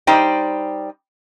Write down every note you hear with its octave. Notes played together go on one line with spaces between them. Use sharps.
G3 D#4 C5 D5 G5